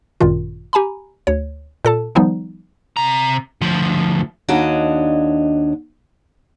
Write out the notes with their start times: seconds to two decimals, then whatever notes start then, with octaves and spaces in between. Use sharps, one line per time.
0.21 G#1 F#2 A#2 D#3 F4
0.73 G4 G#5 A#5 B5
1.27 D2 C#5
1.85 A#2 A4 A5
2.15 D#3 F3 G3 B3 D#4
2.97 C3 A#5
3.61 D2 F3
4.48 D#2 D4 F#4 C#5 D#5